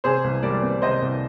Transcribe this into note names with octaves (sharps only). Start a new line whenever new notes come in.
C3 G#4 C5
C2
G3 A#4 D5
C4
C3 C5 D#5
C2